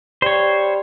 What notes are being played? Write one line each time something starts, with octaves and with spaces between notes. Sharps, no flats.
G3 C5 C#5